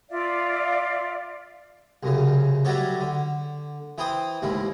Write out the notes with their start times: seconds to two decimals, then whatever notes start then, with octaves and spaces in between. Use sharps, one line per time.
0.10 F4 D5 E5 F5
2.03 C2 F#2 C#3
2.65 F#3 G3 A3 F#4 A4 C#5
3.01 D3
3.98 E3 E4 C5 G5 D#6
4.42 A1 D#2 G#2 E4